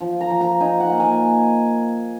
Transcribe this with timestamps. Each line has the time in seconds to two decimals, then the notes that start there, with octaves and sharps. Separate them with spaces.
0.01 F3
0.21 A#5
0.30 F3
0.41 A#5
0.60 D#4 G#5
0.80 F#5
0.91 A#3
1.00 G#5